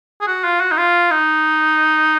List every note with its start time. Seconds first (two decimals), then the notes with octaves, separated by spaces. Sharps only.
0.21 G#4
0.27 F#4
0.44 F4
0.61 F#4
0.72 D#4
0.78 F4
1.11 D#4